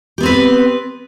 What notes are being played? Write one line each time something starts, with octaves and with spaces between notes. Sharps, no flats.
B3 C4 G4 B4